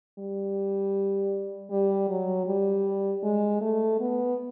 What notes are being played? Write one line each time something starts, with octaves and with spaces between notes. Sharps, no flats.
G3
G3
F#3
G3
G#3
A3
B3